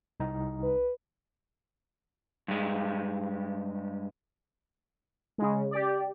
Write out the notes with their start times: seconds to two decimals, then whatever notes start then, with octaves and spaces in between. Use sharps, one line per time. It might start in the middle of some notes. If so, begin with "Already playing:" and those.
0.20 C2 D#4
0.63 B4
2.48 G2 G#3
5.38 C#3 G#3
5.71 G4 D5